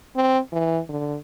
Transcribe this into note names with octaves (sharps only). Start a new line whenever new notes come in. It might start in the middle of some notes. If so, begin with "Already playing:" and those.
C4
E3
D3